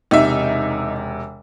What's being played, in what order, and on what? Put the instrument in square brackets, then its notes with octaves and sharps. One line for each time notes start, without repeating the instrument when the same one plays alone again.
[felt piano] E1 C3 [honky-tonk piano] D#4 E5